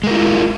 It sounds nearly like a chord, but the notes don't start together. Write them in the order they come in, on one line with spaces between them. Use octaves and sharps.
G#3 A#4 E4 F4